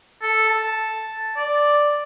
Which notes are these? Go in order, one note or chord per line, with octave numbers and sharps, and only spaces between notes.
A4
A5
D5